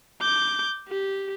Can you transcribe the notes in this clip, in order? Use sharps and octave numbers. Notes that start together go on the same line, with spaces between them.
D6 G6
G4